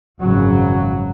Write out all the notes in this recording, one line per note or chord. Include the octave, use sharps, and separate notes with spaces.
G#1 F#2 C#3 F#3